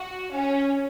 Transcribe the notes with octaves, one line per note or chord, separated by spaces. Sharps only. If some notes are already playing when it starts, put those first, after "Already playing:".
Already playing: F#4
C#4